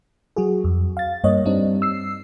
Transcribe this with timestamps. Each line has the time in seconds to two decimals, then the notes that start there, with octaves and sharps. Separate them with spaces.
0.36 F#3 F#4 G#4
0.64 F2
0.97 F5 A6
1.24 G2 A#3 C#5 D#5
1.45 G3 C4 D4 D#4
1.82 E6 C7